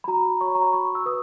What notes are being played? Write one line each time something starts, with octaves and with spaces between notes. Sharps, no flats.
B5
F#4 A#5
C#5 C#6
B5
A#5
B5
F#4 C#6
E6
B4 D#6